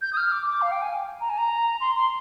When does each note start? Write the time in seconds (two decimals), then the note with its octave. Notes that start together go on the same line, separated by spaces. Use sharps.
0.02 G6
0.13 D#6
0.17 F6
0.32 D6
0.47 D6
0.62 F5
0.72 G5
0.82 G#5
1.21 A#5
1.30 G#5
1.38 A#5
1.81 C6
1.95 C6